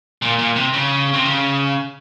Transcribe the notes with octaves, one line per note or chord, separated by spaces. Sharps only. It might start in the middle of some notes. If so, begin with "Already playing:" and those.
A#2
A#2
C3
C#3
C3
C#3